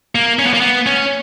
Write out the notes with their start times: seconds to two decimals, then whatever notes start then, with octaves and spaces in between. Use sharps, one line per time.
0.15 A#3
0.39 C#4
0.47 B3
0.53 A#3
0.60 B3
0.86 C#4